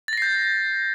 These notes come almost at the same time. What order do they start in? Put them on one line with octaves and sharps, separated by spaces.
A6 A#6 C7 G6